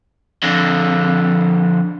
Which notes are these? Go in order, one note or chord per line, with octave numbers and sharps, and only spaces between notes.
F2 D3